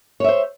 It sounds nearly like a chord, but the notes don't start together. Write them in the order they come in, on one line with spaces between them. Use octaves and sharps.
C#5 E5 C5